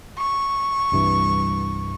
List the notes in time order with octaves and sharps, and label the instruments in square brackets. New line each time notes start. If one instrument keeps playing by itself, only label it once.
[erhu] C#6
[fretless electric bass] C2 G2 E3